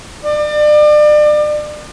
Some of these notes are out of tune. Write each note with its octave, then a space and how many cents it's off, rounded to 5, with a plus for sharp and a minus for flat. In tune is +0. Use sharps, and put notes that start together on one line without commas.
D5 +35